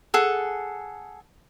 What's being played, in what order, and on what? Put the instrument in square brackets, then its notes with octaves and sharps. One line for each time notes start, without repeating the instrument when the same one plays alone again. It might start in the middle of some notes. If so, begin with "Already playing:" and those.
[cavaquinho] G#4 A4 F#5